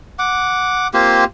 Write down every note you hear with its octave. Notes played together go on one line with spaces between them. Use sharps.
F#5 D6
A#3 C4 F4 G4